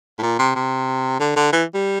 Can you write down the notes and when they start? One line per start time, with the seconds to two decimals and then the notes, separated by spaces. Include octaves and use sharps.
0.19 A2
0.22 A#2
0.39 C3
0.55 C3
1.20 D3
1.36 D3
1.52 E3
1.74 G3